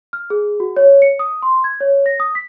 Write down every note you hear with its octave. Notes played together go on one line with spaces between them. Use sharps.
F6
G#4
F#4
C#5
C#7
D#6
C6
G#6
C#5
A#6
D#6
B6